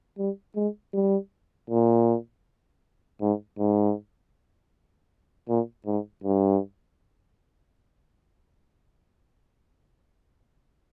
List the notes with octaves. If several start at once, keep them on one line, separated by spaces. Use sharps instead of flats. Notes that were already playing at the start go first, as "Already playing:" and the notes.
G3
G#3
G3
A#2
G#2
G#2
A#2
G#2
G2